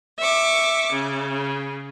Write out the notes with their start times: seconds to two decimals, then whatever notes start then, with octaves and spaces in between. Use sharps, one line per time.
0.19 E5 C#6 D6
0.92 C#3